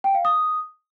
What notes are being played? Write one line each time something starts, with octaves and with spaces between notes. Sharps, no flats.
G5
F5
D#6